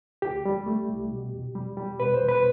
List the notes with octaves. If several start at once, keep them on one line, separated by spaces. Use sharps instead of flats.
D2 G4
G3
A3
C2
B2
E2
G3
G3
B2 B4
C5
E2
B4